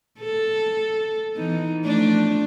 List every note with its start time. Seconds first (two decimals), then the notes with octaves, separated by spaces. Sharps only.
0.20 A4
1.36 E3 B3 D#4
1.85 F3 A3 D4